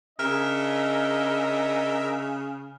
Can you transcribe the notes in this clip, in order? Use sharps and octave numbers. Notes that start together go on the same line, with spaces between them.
C#3 C#4 D4 A#4 D#5 E5 F6